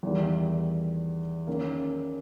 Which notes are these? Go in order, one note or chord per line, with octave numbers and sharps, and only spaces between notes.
E2 D#3 G3
D#3 A#3 C#4